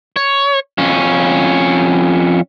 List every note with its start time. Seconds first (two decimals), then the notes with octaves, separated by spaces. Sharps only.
0.16 C#5
0.78 F2 C#4